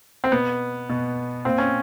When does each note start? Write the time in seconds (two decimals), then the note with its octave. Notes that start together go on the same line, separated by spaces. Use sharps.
0.24 C4
0.32 B2 B3
0.89 B2
1.45 A#2 C4
1.58 C#4